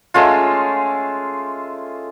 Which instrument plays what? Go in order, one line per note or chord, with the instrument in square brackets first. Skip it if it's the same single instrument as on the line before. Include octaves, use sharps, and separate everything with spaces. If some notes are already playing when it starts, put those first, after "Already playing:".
[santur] G#3 A3 C#4 F4